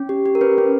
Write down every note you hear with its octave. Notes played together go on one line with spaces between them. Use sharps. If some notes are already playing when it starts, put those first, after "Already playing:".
Already playing: C#4
G4
G4
A#4
C#4 B4
C#4